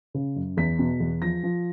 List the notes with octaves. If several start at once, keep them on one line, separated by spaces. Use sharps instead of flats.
C#3
F#2
E2 B6
B2
E2
F3 A#6
F3